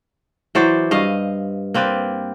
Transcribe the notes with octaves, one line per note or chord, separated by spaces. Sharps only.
E3 F#3 C5 D5
G2 D#5 F5
A#3 C4 B4 D5